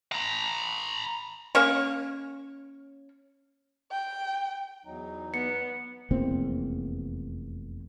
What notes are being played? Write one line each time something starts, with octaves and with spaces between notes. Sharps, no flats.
A#5 B5
A#3 C#4 C#5
G5
E2 F#3 D#4
B3 C#7
F1 E2 A#3 C4